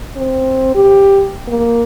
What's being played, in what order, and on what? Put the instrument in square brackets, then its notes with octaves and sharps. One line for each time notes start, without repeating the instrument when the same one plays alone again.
[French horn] C4
G4
A#3